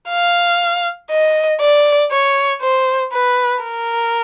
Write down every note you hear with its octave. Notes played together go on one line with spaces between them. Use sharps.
F5
D#5
D5
C#5
C5
B4
A#4